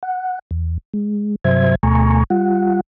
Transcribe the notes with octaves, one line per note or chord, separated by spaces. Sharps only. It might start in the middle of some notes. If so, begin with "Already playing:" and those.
F#5
E2
G#3
G2 C3 F#3 C5 E5 G#6
D2 B2 A3 G#5 A#5 C#6
G3 F4 F#5